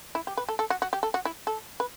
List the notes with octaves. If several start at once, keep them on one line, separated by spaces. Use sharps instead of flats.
E4
G4
B4
A4
A4
F#4
F#4
G4
A4
F#4
E4
A4
B4